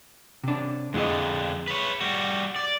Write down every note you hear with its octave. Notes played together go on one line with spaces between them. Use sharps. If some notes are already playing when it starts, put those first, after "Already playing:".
C3 D4
F2 D3 G#3 E4 D#5
B4 C#5
G3 F#4
D5